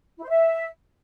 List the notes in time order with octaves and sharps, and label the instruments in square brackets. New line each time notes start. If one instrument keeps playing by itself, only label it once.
[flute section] E4
C5
E5